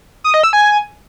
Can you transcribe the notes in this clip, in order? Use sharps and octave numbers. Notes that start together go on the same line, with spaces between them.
D#6
D#5
E6
G#5